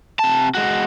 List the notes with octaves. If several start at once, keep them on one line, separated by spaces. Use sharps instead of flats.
C3 A5
G#3 F#4